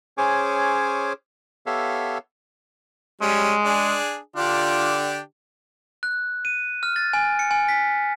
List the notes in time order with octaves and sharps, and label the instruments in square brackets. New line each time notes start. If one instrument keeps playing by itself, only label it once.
[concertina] C#4 G#4 C5 C#5 G#5 D6
B3 G4 A4 C#5 E5 F5
[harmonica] G3 C#4 [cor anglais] G#3
[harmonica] D4 G#4
[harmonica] D3 D4 G4 [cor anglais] F4
[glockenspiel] F#6
D#7
F6
A6
G#5
C#7
G#5
B6